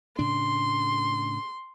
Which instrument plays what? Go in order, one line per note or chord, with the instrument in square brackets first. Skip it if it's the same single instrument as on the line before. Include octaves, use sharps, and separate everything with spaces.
[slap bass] A2 C#3 D4 [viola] C6